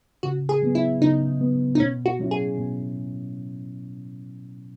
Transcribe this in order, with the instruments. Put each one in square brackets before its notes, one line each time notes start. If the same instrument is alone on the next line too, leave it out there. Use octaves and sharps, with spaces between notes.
[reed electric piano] C#3 [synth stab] F#4
[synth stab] G#4
[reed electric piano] F#3 B3
[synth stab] E4
[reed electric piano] C#3 [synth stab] D#4
[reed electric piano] F#3 B3
[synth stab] D#4
[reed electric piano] B2 [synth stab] C#4
[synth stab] F#4
[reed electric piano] F#3 C#4 E4
[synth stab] G#4
[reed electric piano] B2